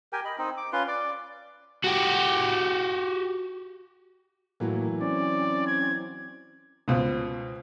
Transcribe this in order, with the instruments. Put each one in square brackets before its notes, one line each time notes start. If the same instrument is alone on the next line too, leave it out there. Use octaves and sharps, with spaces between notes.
[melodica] G4 A#4 G5 G#5
D#5 B5
C4 D#4
D6
C#4 F4 B4 C6
D5 D6
[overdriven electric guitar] F#4 G4
[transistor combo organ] A2 A#3 [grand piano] E3 F#3
[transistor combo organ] C4 C#4 [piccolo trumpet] D5
[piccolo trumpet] G#6
[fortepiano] C#2 B2 F4 C5